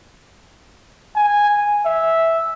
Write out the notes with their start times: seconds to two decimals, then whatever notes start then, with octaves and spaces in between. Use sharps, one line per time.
1.16 G#5
1.86 E5